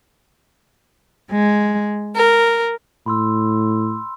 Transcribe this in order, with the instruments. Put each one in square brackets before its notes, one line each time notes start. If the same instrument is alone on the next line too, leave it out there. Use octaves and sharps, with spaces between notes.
[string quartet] G#3
A#4
[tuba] A2 [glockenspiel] B5 C6 E6